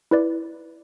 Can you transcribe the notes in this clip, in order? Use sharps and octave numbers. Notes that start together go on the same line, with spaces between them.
E4 B4 D5